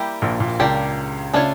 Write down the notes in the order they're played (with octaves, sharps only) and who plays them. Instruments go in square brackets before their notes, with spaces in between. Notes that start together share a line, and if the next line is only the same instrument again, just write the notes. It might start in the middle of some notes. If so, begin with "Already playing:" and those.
Already playing: [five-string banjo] G3 A#3 E4 G4
[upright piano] A#1 A#2
A#1 A#2
[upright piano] C#2 C#3 [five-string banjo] D4 G4 A#4 D5
[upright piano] C#3 [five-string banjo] A3 D4 F4 C#5